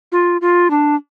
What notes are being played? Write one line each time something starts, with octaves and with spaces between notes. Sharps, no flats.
F4
F4
D4